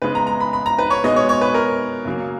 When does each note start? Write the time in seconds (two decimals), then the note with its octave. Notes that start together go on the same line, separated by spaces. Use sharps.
0.02 C#3 G#3 B3 B4
0.15 A#5
0.27 A#5
0.40 B5
0.53 B5
0.66 A#5
0.78 B4
0.90 C#5
1.04 B2 G#3 B3 D#5
1.16 C#5
1.29 C#5
1.41 B4
1.54 A#4
2.05 C#3 F#3 A#3